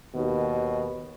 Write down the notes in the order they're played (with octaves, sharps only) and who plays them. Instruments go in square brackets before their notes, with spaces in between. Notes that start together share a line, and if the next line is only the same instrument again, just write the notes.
[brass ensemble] D#2 [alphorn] B2